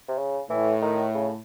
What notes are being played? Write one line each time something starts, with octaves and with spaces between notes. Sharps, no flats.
C3
C#3
A2 E3
D#3
C#3